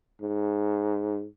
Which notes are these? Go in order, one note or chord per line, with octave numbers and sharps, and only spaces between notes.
G#2